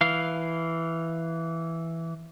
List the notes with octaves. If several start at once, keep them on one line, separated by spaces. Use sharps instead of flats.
E3 F5